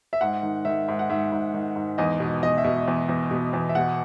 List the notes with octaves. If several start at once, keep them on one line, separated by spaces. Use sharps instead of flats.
E5
G#2 F#5
D#3
D#3 E5
G#2
F#5
G#2 E5
G#2
D#3
G#2
E2 D#5
B2
E2 D#5
E5
B2
E2
E2
B2
E2
E5
B2 F#5